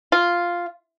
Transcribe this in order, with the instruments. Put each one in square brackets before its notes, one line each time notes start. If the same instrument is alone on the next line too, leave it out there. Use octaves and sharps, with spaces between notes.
[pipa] F4